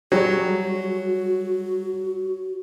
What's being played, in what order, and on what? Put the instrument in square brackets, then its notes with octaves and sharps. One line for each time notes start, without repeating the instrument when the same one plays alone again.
[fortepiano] F#3 [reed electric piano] G3 G#4 C#5 [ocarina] F#4